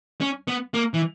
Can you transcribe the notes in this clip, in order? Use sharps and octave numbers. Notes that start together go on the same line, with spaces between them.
C#4
B3
A#3
E3